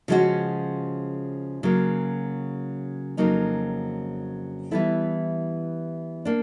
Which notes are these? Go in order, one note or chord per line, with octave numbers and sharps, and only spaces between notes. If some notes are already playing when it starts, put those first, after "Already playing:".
C#3 F3 G#3 C#4 F#4
C#3 F#3 A#3
F2 C#3 F#3 A#3 D#4
E3 G3 B3 E4 A4
A#3 D4